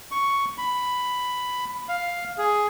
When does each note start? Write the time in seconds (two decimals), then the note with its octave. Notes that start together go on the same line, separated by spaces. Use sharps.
0.11 C#6
0.58 B5
1.89 F5
2.38 G#4